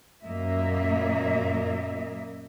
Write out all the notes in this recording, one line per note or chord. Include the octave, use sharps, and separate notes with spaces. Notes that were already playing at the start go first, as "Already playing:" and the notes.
F#2 A#2 A#3 D#5 E5